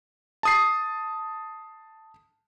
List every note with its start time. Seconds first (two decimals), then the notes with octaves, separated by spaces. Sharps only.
0.43 A5 D#6 C7